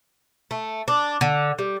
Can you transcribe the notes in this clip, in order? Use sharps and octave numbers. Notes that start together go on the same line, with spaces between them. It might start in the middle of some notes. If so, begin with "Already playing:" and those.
A3
D4
D3
G3